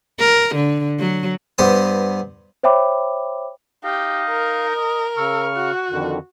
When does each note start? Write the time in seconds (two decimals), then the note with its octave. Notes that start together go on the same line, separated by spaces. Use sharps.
0.19 A#4
0.55 D3
0.99 F#3
1.58 G2 B3 C5 D#6
2.63 C5 C#5 E5 G5 B5 D6
3.84 D#4 G4 F5
4.30 A#4
4.75 D#5
5.17 C#3 C#6 E6 F6
5.56 F#4 F#5
5.91 F2 D3 D#3